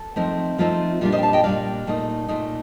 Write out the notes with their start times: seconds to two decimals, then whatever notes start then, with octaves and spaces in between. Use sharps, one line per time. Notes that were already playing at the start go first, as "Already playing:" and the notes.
Already playing: A4
0.16 F3 A3 C4 D#4
0.58 F3 A3 C4 D#4 F4
1.01 A#2 G3 D4 F4
1.12 C5 D#5
1.18 G5
1.22 F5 A5
1.33 D#5 G5
1.43 A#2 G3 D4 D5 F5
1.87 A#2 A3 D#4
2.28 A#2 A3 D#4